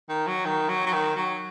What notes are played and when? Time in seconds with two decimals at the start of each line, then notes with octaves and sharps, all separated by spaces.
0.09 D#3
0.27 F#3
0.45 D#3
0.68 F#3
0.86 F#3
0.93 D#3
1.16 F#3